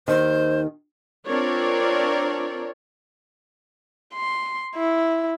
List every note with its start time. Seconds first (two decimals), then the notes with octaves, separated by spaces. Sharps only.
0.08 D#2 D#3 C5
1.26 C4 D4 F4 A#4 C#5 D5
4.14 C6
4.76 E4